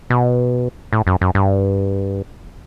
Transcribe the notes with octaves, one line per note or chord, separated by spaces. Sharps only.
B2
A2
F#2
F#2
G2